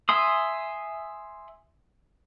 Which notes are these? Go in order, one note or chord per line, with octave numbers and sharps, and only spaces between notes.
E5 G#5 C6 D#6